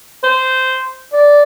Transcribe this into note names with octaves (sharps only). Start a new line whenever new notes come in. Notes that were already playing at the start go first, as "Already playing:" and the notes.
C5
D5